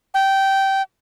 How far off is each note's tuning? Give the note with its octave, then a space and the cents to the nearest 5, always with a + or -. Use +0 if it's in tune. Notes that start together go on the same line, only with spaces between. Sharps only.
G5 -15